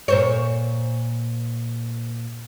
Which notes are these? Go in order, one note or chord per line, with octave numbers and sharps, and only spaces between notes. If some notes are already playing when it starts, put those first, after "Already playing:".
A#2 C5 C#5